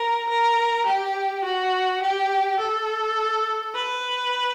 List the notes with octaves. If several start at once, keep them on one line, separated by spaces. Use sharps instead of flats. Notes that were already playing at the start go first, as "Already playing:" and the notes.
Already playing: A#4
A#4
G4
F#4
G4
A4
B4